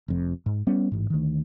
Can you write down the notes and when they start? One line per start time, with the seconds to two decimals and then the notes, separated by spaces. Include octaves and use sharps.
0.08 F1 F2
0.46 G#2
0.67 G3 B3 C#4
0.92 A1 G#2
1.10 D2 D#3